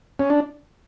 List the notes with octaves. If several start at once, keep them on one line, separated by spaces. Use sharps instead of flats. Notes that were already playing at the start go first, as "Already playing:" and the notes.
C#4
D4